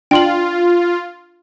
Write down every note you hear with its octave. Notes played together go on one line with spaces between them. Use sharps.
D4 F4 G5 C6 F#7